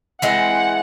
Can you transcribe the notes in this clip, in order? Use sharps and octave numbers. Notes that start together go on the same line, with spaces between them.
E3 G#3 C4 F#5